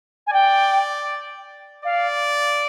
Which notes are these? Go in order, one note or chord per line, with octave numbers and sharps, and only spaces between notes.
G#5
D5 G5
D5 F5